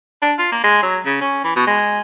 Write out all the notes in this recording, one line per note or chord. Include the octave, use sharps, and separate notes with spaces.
D4
F4
A#3
G#3
F#3
C#3
C#4
E3
B2
G#3